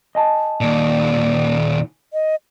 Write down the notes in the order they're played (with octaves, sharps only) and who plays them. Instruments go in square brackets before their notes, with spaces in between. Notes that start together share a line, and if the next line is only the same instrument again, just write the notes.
[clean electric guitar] D#5 G#5 A5
[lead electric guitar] D#2 A#2 [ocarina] D5
[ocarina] D#5